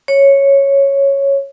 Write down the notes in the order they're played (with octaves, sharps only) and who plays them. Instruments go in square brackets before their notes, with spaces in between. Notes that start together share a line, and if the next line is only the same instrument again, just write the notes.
[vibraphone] C#5